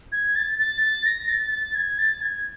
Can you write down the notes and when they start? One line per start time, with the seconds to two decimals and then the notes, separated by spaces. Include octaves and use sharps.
0.12 G#6
0.36 A6
0.59 A6
0.82 A6
1.05 A#6
1.29 A6
1.52 A6
1.75 G#6
1.99 A6
2.22 G#6